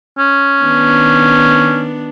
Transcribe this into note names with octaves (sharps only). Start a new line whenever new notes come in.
C#4
D#3 B3 D4